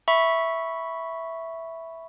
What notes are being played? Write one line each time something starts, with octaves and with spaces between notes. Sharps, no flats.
E5 B5 C#6